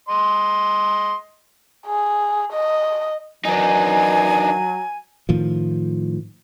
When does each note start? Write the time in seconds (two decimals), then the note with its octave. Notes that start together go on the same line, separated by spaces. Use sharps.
0.09 D#5 C6
1.87 G#4
2.53 D#5
3.45 D#3 E3 F#3 D4 D#4 G#5
5.29 A2 D#3 F3